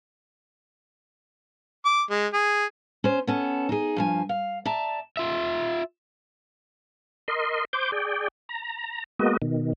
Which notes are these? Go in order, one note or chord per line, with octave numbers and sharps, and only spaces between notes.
D6
G#3
G#4
C#4 C5
B3 C#4 A4
D#4 G#4
G2 F3 G#5
F5
D5 E5 A5 A#5
F4 E5
A#4 D#5 C6
C5 D6 G6
G#4 D5 G5
A#5
G#3 A#3 B3 F#4 D#5
B2 D#3